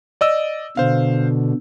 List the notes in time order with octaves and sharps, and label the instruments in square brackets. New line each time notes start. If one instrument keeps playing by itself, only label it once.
[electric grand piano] D5 D#5 E6
[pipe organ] B2 D3 [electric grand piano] C5 F5